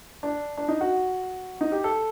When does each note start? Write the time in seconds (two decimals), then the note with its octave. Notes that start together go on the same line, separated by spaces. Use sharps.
0.23 D4
0.57 D4
0.68 D#4
0.81 F#4
1.61 D#4
1.72 G4
1.84 A4